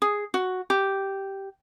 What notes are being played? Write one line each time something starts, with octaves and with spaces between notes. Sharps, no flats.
G#4
F#4
G4